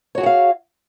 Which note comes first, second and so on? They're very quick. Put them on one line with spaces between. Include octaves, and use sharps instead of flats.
C#5 F#4 G#4 F#5 F5